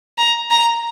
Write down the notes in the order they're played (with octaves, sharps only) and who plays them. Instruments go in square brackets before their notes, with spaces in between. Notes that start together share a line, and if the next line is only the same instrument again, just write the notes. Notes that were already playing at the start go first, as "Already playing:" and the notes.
[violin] A#5
A#5